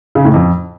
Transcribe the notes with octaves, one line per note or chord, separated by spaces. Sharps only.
C#3
A2
F2